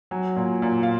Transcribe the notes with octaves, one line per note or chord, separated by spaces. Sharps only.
F#3 G#5
A#2
A#2
F5